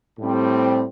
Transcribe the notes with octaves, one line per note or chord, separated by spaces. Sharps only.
A2 G3 C4